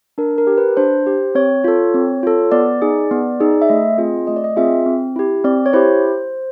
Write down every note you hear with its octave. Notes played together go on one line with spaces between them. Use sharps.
D4 A#4
A#4
G4
B4
D4 C5
G4
C4 C#5
F4 A4
C4
F4 A4
B3 D5
D#4 G#4
B3
D#4 G#4
E5
A3 D#5
C4 F4 G#4
A3 D#5
D5
D#5
C4 F4 G#4 E5
C4
E4 G4
C4 D5
C#5
E4 G4 C5